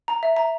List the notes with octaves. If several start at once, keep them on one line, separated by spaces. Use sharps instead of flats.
A#5
E5
A#5